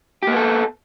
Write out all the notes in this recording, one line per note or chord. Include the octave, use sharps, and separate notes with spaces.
A#3 B3 G4 A4